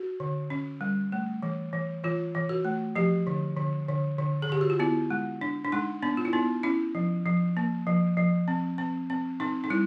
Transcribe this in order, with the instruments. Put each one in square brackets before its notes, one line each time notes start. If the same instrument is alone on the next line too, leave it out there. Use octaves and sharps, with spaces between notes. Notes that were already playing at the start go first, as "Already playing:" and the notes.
Already playing: [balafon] F#4
D3
C#4
G3
A3
E3
E3
E3 F4
E3
F#4
A3
F3 G4
D3
D3
D3
D3
G#4
D3 G4
F#4
F4
B3 E4
G#3
D4
D4
G#3 D#4
B3 D4
F4
E4
B3 D#4
C#4 E4
F3
F3
A#3
F3
F3
C4
C4
C4
C4 D#4
D#4
G3 E4